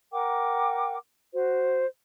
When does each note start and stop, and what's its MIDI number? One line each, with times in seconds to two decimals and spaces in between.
0.12 0.97 70
0.12 0.97 78
0.12 0.97 79
0.12 0.97 86
1.33 1.85 66
1.33 1.85 72